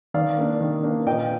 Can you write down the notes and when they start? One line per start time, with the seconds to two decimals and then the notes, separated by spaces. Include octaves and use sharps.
0.14 D#3 D5 F5
0.38 A#3 D4
0.61 D#3
0.83 A#3 D4
1.07 A#2 D#5 G5